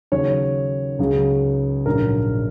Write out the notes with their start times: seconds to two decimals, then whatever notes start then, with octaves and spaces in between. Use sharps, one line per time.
0.12 D#2 C#3 F#3 C#5
0.99 C#2 C#3 F#3
1.86 A#1 G#2 F#3 A#4